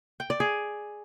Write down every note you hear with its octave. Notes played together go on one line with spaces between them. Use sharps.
G5
D5
G#4